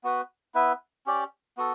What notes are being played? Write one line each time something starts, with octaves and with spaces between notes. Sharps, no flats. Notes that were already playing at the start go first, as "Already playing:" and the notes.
B3 F#4 B4
B3 E4 B4 E5
C#4 G4 D5
B3 F#4 A4